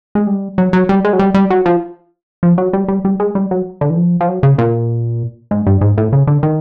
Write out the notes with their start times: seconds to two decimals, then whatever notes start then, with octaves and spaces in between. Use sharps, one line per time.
0.15 G#3
0.27 G3
0.58 F#3
0.73 F#3
0.89 G3
1.05 G#3
1.13 F#3
1.19 G3
1.34 G3
1.50 F#3
1.66 F3
2.43 F3
2.58 F#3
2.73 G3
2.88 G3
3.05 G3
3.20 G#3
3.35 G3
3.51 F#3
3.81 D3
3.90 E3
3.97 F3
4.21 F3
4.28 F#3
4.43 C#3
4.58 A#2
5.51 G#2
5.67 G2
5.81 G#2
5.98 A2
6.13 C#3
6.27 D3
6.43 D#3